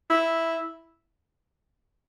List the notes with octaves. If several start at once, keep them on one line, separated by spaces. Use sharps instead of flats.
E4